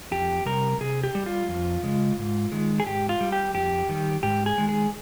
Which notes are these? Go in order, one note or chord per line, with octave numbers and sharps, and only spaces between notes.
F2 G4
C3 G3 A#4
C3 G#4
G4
G3
F4
F2
C#3 G#3
G#2
D#3 G#3
G#4
G#2 G4
F4
G3
G4
F2 G4
D#3 G3
G#2 G4
G#4
D#3 G#3
G#4